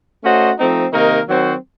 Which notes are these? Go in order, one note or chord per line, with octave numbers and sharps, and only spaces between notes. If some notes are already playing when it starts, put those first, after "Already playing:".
A3 C#4 F#4 C5 D#5
F3 A3 C4 D#4
C3 D#3 A#3 D#4 A#4
D#3 F#3 C4 F#4 C5